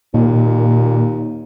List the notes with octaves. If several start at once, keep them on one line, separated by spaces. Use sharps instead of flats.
D#2 A#2